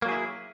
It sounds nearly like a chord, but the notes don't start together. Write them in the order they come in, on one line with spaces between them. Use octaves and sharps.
A#3 F#3 G#4 E4